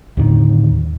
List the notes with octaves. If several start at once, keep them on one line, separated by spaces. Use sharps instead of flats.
D#2 A2 D3 D#3